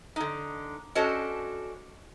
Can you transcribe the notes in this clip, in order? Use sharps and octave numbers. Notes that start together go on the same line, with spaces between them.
D3 D#4
C#4 D4 F#4 A4 C5 D#5